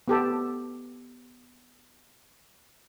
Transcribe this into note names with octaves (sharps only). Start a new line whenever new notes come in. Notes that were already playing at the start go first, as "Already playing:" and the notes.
B3 G4 A4